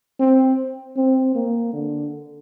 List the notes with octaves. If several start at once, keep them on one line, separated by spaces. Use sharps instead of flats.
C4
C4
A#3
D3